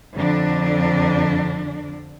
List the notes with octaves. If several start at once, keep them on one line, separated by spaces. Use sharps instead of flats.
F2 D3 D4